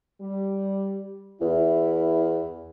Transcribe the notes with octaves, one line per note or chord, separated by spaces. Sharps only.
G3
E2 E4